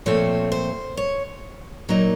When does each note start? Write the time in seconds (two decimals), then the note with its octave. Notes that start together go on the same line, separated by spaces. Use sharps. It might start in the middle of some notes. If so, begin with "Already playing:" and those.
0.06 A#2 F3 A3 C4 C#5
0.52 C5
0.97 C#5
1.89 A#2 F#3 A#3 D#4